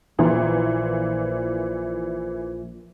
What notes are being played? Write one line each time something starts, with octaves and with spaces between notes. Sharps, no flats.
A#1 A#2 E3 F3